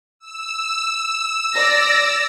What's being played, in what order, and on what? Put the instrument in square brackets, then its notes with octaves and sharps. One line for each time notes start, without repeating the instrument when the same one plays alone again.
[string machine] E6
[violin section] D5 A#6